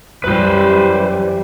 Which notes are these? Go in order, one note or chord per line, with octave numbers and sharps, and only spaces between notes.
F#2 E3 G3 B4 C5